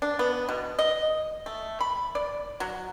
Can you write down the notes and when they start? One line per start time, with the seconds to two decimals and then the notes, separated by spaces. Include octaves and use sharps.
0.02 D4
0.19 B3
0.49 B2
0.79 D#5
1.46 A3
1.81 B5
2.15 D5
2.60 F#3